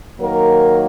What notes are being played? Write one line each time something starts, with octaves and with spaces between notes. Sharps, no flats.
D#3 F#3 A#3 A#4